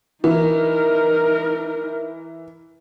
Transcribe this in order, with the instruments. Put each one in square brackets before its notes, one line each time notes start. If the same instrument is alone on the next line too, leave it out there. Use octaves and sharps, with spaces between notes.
[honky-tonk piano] E3 [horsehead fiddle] D#4 A#4